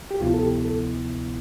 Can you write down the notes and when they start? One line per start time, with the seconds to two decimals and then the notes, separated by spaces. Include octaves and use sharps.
0.11 G4
0.20 D2 C3 F3 B3 E4 F4
0.34 A4
0.43 G4
0.65 A4